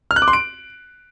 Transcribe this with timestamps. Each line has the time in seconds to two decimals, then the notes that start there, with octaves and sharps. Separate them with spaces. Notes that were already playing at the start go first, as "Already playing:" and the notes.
0.11 F6
0.16 F#6
0.22 D6
0.28 C6
0.33 D7